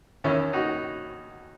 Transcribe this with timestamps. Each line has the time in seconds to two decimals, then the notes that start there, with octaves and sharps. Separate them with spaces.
0.24 E2 D#3 C#4 E4
0.53 D#4 F#4